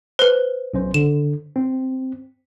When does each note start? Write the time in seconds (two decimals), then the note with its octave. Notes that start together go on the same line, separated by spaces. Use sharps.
0.19 B4 C5
0.74 B1 C#4 C5
0.94 D3 E7
1.56 C4